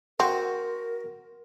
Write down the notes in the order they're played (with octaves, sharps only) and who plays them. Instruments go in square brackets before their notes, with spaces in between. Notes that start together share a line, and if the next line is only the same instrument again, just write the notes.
[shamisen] C4 [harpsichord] F#4 [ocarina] A#4